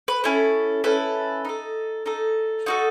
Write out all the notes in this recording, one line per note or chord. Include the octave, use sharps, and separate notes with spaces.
B4
C#4 E4 A4
C#4 E4 A4 B4
D#4 A4
D#4 A4
D#4 F#4 A4